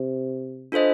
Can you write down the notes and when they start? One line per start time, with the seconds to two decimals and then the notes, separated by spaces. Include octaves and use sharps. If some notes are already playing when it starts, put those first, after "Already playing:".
Already playing: C3
0.72 D4 F4 A4 C5 D#5